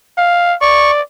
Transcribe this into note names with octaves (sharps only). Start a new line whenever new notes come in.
F5
D5 C#6